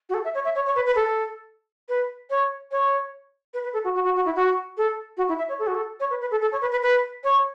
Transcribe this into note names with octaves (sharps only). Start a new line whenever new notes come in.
F#4
A4
E5
C#5
E5
C#5
C#5
B4
B4
A4
B4
C#5
C#5
B4
B4
A4
F#4
F#4
F#4
F#4
E4
F#4
A4
F#4
E4
E5
C#5
A4
F#4
A4
C#5
B4
B4
A4
A4
C#5
B4
B4
B4
C#5